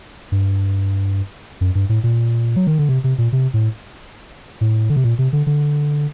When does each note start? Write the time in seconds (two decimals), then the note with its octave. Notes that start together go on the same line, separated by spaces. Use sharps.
0.32 G2
1.61 F#2
1.75 G2
1.89 A2
2.04 A#2
2.56 F#3
2.67 D#3
2.79 D3
2.89 C3
3.04 C3
3.18 A#2
3.33 C3
3.54 A2
4.61 A2
4.89 D3
4.96 C3
5.04 A#2
5.19 C3
5.33 D3
5.47 D3